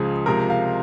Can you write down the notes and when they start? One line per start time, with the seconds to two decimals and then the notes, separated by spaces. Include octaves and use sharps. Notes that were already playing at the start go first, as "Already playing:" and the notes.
Already playing: C#2 C#3 F3 G#4
0.26 C#2 C3 F3 A#4
0.50 F5